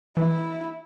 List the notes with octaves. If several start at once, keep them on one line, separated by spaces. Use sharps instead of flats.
E3 E4